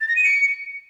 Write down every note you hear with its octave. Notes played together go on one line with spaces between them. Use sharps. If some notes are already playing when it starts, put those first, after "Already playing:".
A6
A#6
D#7
C#7